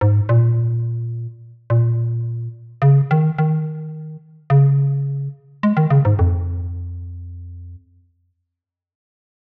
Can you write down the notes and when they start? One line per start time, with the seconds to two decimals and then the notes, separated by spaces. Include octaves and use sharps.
0.01 G#2
0.29 A#2
1.70 A#2
2.82 C#3
3.11 D#3
3.38 D#3
4.50 C#3
5.63 G#3
5.77 D#3
5.90 C#3
6.05 G#2
6.19 F2